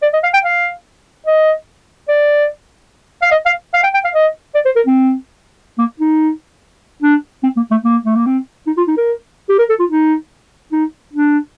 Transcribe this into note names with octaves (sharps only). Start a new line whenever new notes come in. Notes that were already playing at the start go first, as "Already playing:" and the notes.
D5
D#5
F5
G5
F5
D#5
D5
F5
D#5
F5
F5
G5
G5
F5
D#5
D5
C5
A#4
C4
A#3
D#4
D4
C4
A#3
A3
A#3
A3
A#3
C4
D#4
F4
D#4
A#4
G4
A#4
A4
F4
D#4
D#4
D4